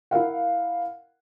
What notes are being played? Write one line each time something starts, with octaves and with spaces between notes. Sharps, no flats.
E4 A#4 F5 F#5